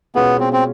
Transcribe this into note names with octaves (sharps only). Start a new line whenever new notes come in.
B2 G#3 B3 C#4 F4 G#4
C4
C4